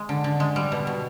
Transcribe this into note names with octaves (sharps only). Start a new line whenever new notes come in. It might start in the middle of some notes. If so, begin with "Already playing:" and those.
Already playing: G#3
D3
D3
G#3
G3
B2
B2